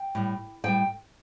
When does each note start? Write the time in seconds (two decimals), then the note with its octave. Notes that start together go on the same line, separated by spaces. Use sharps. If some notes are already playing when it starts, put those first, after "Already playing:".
Already playing: G5
0.15 A2 G3
0.64 A2 G3 G5